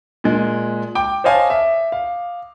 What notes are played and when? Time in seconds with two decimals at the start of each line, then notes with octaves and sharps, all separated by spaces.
0.24 A#2 G#3
0.95 G5 D6
1.24 C5 C#5 D#5 F5 G#5 A5
1.50 E5
1.92 F5